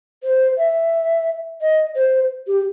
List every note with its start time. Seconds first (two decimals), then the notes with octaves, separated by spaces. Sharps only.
0.23 C5
0.57 E5
1.61 D#5
1.96 C5
2.47 G4